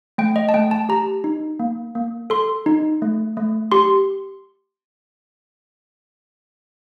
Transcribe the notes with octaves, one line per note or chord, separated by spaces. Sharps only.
A3 G5
D#5
A5
A3 G5
A5
G4 A#5
D#4
A#3
A#3
A4 C6
D#4
A3
A3
G4 C6